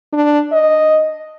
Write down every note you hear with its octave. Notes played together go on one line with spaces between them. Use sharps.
D4
D#5